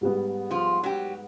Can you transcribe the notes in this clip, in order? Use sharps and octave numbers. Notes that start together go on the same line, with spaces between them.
G#2 G3 B3
F3 F4
F#3 G4